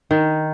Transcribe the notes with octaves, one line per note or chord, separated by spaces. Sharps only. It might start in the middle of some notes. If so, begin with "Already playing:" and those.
D#3